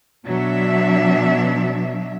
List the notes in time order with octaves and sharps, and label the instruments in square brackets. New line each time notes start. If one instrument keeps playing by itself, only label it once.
[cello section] B2 F#3 D4 E5